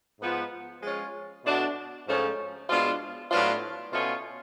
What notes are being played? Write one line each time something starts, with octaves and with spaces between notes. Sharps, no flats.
G#2 F3 B3 F4
F3 G#3 C#4 F4
B2 A3 D4 F#4
G#2 F3 A3 C#4
B2 G#3 D4 F4
A2 F#3 B3 D4 F4
B2 A3 C#4 F4